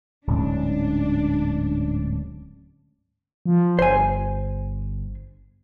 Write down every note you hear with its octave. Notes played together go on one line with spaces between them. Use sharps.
D1 G#2 C#4 D4
F3
G1 C5 G#5